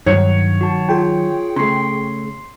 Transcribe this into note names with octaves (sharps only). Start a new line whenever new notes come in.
G2 D#3 F#3 C#5
F#4 A5
F4 G#4 G5
C#3 A3 C6 C7